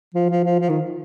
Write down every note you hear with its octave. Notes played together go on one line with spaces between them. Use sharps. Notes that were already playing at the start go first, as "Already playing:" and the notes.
F3
F3
F3
F3
D#3